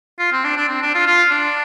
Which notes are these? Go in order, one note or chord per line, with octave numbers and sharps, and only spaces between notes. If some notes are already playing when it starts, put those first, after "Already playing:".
F4
C4
D4
D4
C4
D4
F4
F4
D4